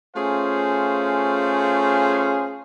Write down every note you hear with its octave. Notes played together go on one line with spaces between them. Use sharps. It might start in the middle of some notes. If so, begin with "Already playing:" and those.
A3 C#4 F4 G#4 C5 F5